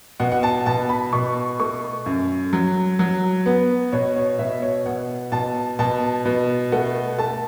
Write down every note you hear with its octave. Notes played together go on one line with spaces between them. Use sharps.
B2 F#5
F#5
A5
B2 A5
B5
B2 C#6
A3 C#6
F#2
F#3
F#3
B3
B2 C#5
C#5
B2 E5
C#5
B2 F#5
B2 A5
B2 A5
B2
A3 F#5
A3 A5